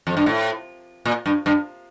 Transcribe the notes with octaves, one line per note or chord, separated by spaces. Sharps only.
F2
G2
A2
A#2
G2
G2